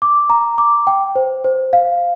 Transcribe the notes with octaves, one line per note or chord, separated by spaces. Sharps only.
D6
A#5
D6
G5
C5
C5
F5